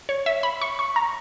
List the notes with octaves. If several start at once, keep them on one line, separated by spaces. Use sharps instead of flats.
C#5
E5
B5
C#6
C#6
A#5